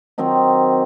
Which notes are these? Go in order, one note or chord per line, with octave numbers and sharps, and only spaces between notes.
D#3 F#3 C4 D#4